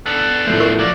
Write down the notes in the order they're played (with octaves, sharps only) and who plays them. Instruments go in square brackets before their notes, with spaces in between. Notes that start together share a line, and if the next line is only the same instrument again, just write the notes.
[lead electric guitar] B3 D4 [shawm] A4
[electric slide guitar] A2 F3 A3 [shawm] C5
[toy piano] A#4 C#6
[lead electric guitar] F#3 A#3 [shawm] D5